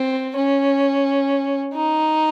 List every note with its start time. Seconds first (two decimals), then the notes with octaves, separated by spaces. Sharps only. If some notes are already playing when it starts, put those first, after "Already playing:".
Already playing: C4
0.36 C#4
1.74 D#4